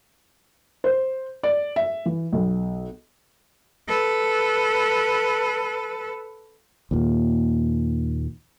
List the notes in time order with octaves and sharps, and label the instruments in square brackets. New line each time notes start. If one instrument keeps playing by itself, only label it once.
[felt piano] C5
D5
E5
E3
B1
[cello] A4 B4
[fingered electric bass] D#2 A#2